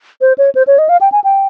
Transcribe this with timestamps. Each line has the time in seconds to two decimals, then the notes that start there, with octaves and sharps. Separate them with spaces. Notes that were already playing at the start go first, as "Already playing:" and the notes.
0.21 C5
0.38 C#5
0.55 C5
0.67 C#5
0.78 D#5
0.89 F5
1.01 G5
1.12 G#5
1.24 G5